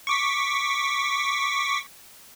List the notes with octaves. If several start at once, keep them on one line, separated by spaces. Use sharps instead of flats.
C#6 D6 B6